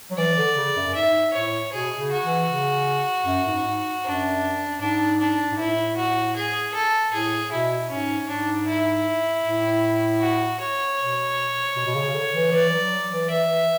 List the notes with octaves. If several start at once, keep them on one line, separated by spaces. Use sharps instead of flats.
F#3
E3 D5
D3
C#3
F#2
F#2
G#2 E5
A2 C#5
B2 G#4
C#3
F#4
E3
C#3
F#2
G#2
G#2
F#2 D4
G#2 D4
D4
G#2
A2 E4
F#4
G#4
A4
A2 G#4
B2 E4
G#2 C#4
G#2 D4
E4
A2
F#4
C#5
B2
B2
B2
C#3
C#3
D3
E3
E3 D5
F#3
F#3
E3
E3 E5
E3